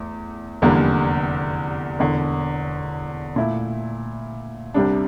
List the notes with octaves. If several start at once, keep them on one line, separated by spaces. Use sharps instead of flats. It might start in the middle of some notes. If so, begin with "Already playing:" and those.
Already playing: E2 A3
F1 E2 D3 G3 A#3
E1 E2 D3
A#2 A3 E4
C2 C3 G3 D4